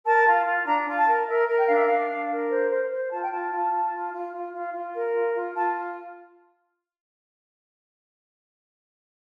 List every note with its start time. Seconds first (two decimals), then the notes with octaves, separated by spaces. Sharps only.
0.05 A#4 A5
0.25 F4
0.46 F4
0.66 D4 A#5
0.86 F4
0.97 A5
1.07 A#4
1.27 A#4 E5
1.47 A#4
1.58 G5
1.66 D4 F5
1.74 E5
1.83 D4 F5
2.08 D4
2.29 A#4
2.49 C5
2.69 C5
2.90 C5
3.10 F4 A5
3.21 G5
3.31 F4 A5
3.51 F4
3.71 F4
3.92 F4
4.12 F4
4.32 F4
4.53 F4
4.73 F4
4.93 A#4
5.14 F4
5.34 F4
5.54 F4 A5